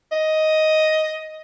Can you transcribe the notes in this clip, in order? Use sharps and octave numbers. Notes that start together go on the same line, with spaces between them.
D#5